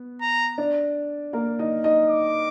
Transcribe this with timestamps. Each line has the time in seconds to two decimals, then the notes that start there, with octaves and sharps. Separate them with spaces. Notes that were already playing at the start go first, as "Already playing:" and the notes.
Already playing: B3
0.21 A#5
0.58 D4 D5
1.33 A#3 A#4
1.59 D#4 D#5
1.84 D#4 D#5
2.09 D6